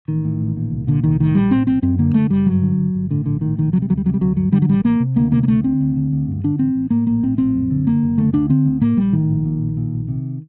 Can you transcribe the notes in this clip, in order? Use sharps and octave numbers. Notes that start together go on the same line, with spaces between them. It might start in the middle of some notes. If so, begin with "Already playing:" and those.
A1 D#3
A2
A1
A#2
C2
A#2 D3
C2 D#3
A2 D#3
A#1 G3
A2 C4
A#1 C4
F#2 C4
D3 A#3
F#1 A3
F#1 G3
G2 F#3
D3
G1
G1
A2 D3
A#1 D3
A2 D#3
A#1 D#3
C3 F#3
G3
D2 F#3
G3
C3 F#3
G3
D2 F#3
G2 F#3
D3 G3
F#3
A1 G3
A1 A#3
C3
D2 A#3
C3 A#3
A#3
D2 A3
D3 C4
D2
D3
D2
G2
D3 D4
A1 C4
A1
A2 A#3
A#1 A#3
A2 C4
A#1 C4
F#2
D3
F#1 A#3
F#1
D3 A3
D2 D4
D3 C4
D2
A2 A#3
A#1 G3
A2 D#3
A#1
A#2
A#1
A#2
A#1
C3